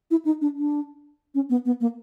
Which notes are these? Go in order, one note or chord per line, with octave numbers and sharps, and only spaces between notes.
E4
D#4
D4
D4
C#4
B3
B3
A#3